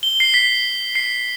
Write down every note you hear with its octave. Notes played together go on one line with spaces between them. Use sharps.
G7
C7
B6
C7